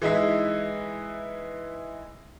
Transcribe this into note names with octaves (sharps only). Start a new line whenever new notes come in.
E3 G#3 D#4 E4 E5